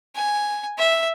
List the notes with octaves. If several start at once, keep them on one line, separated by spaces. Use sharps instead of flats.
G#5
E5